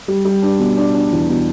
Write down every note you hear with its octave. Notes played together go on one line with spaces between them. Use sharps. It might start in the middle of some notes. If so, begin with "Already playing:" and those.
G3
G3
D4
B2
D4
D4
E2
B2